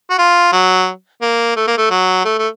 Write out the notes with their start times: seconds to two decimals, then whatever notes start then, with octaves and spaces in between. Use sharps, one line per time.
0.10 F#4
0.18 F4
0.52 F#3
1.22 A#3
1.56 A3
1.67 A#3
1.78 A3
1.91 F#3
2.25 A3
2.39 A3